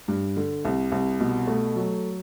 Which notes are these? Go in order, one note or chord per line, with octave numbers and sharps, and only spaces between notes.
G2
D3
C2
C2
B2
A3
F#3